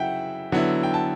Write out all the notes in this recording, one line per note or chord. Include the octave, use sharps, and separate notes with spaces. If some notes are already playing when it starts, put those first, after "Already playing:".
Already playing: C#3 F#3 E4 E5 F#5 G5
D3 F#3 B3 E4
G5
A5